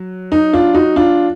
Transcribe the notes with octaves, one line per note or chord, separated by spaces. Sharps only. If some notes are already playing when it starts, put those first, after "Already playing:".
Already playing: F#3
D#4
D4 F4
D#4 F#4
D4 F4